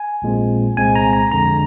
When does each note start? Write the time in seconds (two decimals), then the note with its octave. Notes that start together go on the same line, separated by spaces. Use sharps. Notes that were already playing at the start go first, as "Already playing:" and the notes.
Already playing: G#5
0.22 A#1 A#2 G#3 C4
0.77 C2 A#2 G#3 C4 G#5
0.95 A#5
1.13 A#5
1.32 F2 D3 G#3 A#5